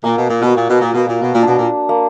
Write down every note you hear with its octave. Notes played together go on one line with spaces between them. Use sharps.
A#2 A#3
B2
A#2
B2
F#4
A#2
B2
A#2
B2 A#3
A#2
B2
A#2
B2 D4
A#2
A#3